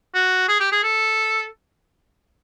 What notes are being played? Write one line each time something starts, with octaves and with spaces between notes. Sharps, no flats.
F#4
G#4
G4
G#4
A4